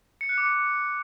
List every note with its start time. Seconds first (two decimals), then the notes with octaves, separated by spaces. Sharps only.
0.21 C#7
0.29 F#6
0.38 D6
0.46 C#7